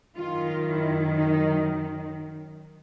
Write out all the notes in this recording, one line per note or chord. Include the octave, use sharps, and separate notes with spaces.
F#2 D#3 F4
E4
D#4